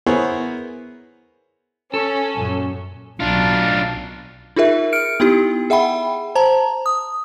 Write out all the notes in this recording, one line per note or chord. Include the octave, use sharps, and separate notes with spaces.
B3 E4 G#4 A#4 C5 C#5
C#4 A4
F#2 A#2
B1 F#3 D4 F4
D#4 F4 G#4 A#4 E5
F6 C#7 D7
B3 D#4 E4 G4
G#4 E5 F#5 G5 B5
C5 A5 A#5
D#6